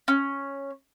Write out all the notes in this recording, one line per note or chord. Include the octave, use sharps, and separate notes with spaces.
C#4